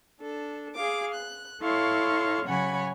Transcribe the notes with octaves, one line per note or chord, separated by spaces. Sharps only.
D4 A4
G#4 F5 D6
F#6
E4 A4 C#5 F5 C6 C#6
C#3 F#3 C#5 F#5 G#5 B5